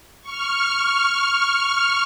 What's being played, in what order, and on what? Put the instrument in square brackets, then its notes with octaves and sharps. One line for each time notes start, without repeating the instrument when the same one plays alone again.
[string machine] C#6 F6